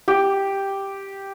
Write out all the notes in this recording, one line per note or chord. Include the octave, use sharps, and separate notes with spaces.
G4